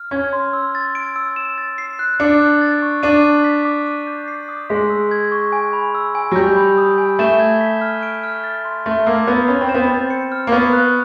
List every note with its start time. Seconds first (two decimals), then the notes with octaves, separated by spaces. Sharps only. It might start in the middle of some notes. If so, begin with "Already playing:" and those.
Already playing: F6
0.11 C#4 G#6
0.33 C6
0.53 E6
0.75 A6
0.95 D7
1.16 E6
1.36 E7
1.58 A6
1.78 C7
1.99 F#6
2.20 D4 C#7
2.40 F#6
2.61 A6
2.82 C#6
3.03 D4 D#7
3.24 F#6
3.44 B6
3.65 D6
3.86 D#7
4.07 G6
4.28 C7
4.48 D#6
4.70 G#3 B6
4.90 E6
5.11 G#6
5.32 C#6
5.53 G#5
5.73 B5
5.95 E6
6.15 G#5
6.31 F#3
6.36 G3 G6
6.57 B5
6.78 D#6
6.98 G#5
7.19 A3 E7
7.40 G#6
7.61 B6
7.81 F6
8.03 D7
8.24 F6
8.44 A6
8.65 C6
8.86 A3 A#6
9.06 A#3 E6
9.27 B3 G6
9.48 C#4 B5
9.61 C4
9.69 E7
9.75 B3
9.87 C4 A6
10.10 C#7
10.32 F6
10.47 A#3
10.52 B3 C#6
10.73 F#6